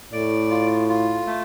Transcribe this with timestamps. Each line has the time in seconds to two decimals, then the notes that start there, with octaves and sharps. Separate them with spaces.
0.12 A2 D5
0.50 F4
0.89 F4
1.27 A3